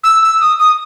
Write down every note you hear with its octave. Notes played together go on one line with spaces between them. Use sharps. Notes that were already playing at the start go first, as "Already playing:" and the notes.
E6
E6
D#6
D#6